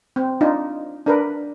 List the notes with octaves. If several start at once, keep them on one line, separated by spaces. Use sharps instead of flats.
C4
D4 D#4 F4
D4 A#4 B4